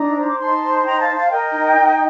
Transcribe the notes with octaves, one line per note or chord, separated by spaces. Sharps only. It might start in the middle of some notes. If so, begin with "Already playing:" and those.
Already playing: D4 D#4 A#5
C5
D6
D#4 A5 C6
C5
D#4 G5 A#5
F5 A5
C5
F5 A5
A#4 D#5 G5
D#4
D#4